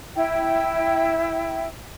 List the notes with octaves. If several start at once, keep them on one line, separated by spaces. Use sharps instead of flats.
E4 G5